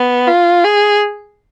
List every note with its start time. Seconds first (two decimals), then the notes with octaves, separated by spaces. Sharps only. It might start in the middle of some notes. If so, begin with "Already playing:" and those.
Already playing: B3
0.27 F4
0.64 G#4